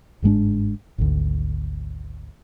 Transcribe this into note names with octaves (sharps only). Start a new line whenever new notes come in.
G1 G#2 G#3 D4
G#1 D2